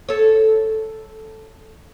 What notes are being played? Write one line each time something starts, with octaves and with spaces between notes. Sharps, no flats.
A4 C#5